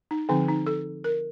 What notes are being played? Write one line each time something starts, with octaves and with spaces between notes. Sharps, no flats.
D#4
D3 F3 C4 D#4
D#4
A4
A#4